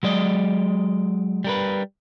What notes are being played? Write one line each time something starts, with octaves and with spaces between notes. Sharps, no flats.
F#3 G#3 D5 D#5
G3 A#4 B4